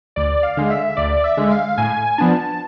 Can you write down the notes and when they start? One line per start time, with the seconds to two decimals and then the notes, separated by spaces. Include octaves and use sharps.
0.16 D2 D5
0.43 F5
0.57 D3 G#3
0.70 E5
0.97 D2 D5
1.24 E5
1.37 D3 G#3
1.51 F5
1.78 A2 G#5
2.18 F3 B3 D4 A5